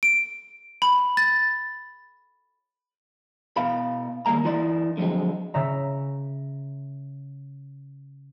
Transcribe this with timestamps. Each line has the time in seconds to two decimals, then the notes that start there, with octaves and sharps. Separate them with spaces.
0.03 D7
0.82 B5
1.17 A6
3.57 B2 F5 B5
4.26 D#3 G3 G#3 A#3 A#5
4.44 E3 D#4 E4 D5 C6
4.97 D3 F3 F#3 G#3 C4
5.54 C#3 E5 A#5